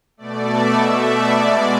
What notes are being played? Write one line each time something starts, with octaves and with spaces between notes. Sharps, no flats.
B2 A3 D5
E5
B2 A3 E5
D5
B2 G#3